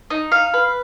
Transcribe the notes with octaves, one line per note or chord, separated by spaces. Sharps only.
D#4
F5
B4